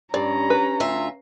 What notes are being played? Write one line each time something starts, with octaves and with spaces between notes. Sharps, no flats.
G2 C#4 D5 A#5
B4
D2 F4 E5